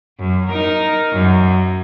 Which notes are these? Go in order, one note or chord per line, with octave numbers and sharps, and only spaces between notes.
F#2
D#4 A#4
F#2